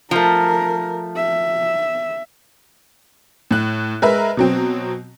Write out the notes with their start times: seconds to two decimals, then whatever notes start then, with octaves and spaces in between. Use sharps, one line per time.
0.11 F3 A3 A#4
1.17 E5
3.51 A2 F#6
4.02 G#3 A#4 B4 E5
4.37 B2 F#3 C4